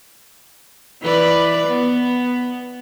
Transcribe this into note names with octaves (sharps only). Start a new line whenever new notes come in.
E3 B4 D5
B3